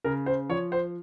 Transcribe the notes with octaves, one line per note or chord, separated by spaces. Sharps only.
C#3 A#4
C5
F3 C#5
C5